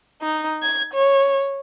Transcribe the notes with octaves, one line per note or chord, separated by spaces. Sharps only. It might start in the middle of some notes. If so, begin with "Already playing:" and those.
D#4
G#6
C#5